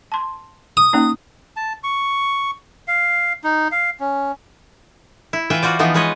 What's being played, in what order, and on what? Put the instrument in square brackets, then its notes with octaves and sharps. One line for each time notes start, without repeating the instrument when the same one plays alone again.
[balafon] A5 C6
[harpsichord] D#6
[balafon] A#3 C#4 D#4
[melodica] A5
C#6
F5
D#4
F5
C#4
[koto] E4
E3 F4 B4 E5 G5
F4 F#4 C5 D5
E3 F3 B3 D#4 F4
G#3 B3 B4 C#5 D#5